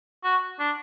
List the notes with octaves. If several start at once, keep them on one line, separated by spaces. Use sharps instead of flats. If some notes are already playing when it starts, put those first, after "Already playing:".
F#4
D4